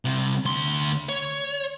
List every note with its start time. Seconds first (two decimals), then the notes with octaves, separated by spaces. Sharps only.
0.05 C2 C3
0.45 D2 C6
1.09 C#5